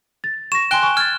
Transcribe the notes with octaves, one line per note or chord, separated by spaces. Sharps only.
A6
C#6 A#6 E7
G5 G#5 C6 F#6 D7 G7
G#5 C#6
F6 G#6 A6